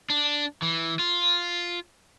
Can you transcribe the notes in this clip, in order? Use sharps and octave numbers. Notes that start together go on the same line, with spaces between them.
D4
E3
F4